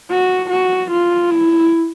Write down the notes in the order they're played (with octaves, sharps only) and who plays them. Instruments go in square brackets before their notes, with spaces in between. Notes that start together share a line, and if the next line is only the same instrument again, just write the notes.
[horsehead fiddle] F#4
F#4
F4
E4